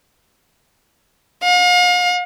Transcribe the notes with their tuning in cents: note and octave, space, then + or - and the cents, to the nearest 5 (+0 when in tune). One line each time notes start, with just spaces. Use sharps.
F5 +40